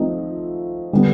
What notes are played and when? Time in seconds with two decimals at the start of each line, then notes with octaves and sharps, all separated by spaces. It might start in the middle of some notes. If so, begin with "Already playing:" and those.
Already playing: F3 A3 C4 D#4
0.93 D3 G3 B3